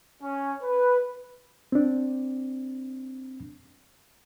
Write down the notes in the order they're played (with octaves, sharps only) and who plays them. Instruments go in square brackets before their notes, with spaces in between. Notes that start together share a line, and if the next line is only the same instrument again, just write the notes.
[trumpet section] C#4
B4
[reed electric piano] C4 D4